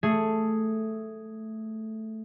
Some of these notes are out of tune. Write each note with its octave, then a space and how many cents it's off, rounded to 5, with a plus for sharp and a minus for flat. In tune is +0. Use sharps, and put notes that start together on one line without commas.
A3 +0 G#4 +0